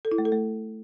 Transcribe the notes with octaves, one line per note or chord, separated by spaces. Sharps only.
A4
E4
A3
A4
A3